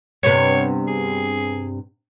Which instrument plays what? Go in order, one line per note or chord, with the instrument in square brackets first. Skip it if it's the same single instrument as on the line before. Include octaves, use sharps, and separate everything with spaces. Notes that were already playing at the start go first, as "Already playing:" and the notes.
[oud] G2 C3 B3 [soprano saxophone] C#5
[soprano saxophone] G#4